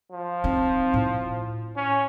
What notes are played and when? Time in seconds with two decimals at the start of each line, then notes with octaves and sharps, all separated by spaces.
0.12 F3
0.44 C4 D#4
0.94 A2
1.76 C#4